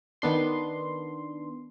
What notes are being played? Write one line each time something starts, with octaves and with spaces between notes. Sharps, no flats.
D#3 B3 D4 C6